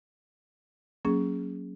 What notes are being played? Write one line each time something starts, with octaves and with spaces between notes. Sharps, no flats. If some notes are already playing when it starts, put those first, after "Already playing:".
F#3 A#3 C#4 G#4